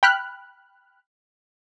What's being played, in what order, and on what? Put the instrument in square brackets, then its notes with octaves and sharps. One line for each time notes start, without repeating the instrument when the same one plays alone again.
[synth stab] G5 B5 F6 F#6